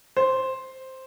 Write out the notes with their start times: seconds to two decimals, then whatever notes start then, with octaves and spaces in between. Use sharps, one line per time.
0.17 C5